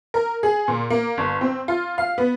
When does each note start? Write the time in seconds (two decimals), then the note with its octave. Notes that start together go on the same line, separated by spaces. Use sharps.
0.14 A#4
0.43 G#4
0.68 A#2
0.90 A#3
1.17 G1
1.41 C4
1.68 F4
1.98 F5
2.18 B3